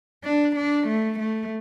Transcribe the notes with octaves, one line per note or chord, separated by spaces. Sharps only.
D4
D4
A3
A3